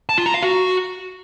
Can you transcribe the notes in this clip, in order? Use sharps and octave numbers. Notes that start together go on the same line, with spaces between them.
A5
F4
A#5
F5
F#4